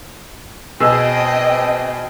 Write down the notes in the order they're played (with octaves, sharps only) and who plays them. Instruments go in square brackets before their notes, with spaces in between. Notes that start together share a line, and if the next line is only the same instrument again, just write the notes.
[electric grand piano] B2 G#4 E6 [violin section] C4 D#5 G5